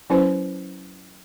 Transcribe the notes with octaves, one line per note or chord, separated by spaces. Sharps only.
F#3 C#4 E4 B4 C5